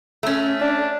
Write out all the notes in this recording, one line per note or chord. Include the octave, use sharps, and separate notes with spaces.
A3 C#4
D4